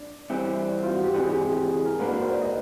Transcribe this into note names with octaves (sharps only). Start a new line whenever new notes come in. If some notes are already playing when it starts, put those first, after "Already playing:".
Already playing: D4
C3 E3 G3 C4
F4
F#4
G4
C#2 C3 E3 G4
G#4
G4
G#4
G4
G4
G#4
A#4
G#2 F3 A#3 D4 F#4 B4
A#4
C5
D5
D#5